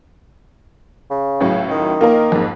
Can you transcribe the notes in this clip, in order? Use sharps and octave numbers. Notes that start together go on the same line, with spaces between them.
C#3
C#2 A2 F#3
D#3
A#3 D#4 F4 A#4
F2 G#2